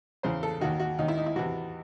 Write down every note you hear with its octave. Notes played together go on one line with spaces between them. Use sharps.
E2 C#3 E3 C5
A4
D#2 D#3 F#4
F#4
D#2 D#3 D#4
E4
D#4
E4
E2 C3 E3 F#4